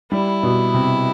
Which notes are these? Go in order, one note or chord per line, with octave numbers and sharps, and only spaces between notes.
G3 E4
B2
C3